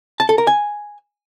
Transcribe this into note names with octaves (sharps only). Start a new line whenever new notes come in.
A5
A4
A#4
G#5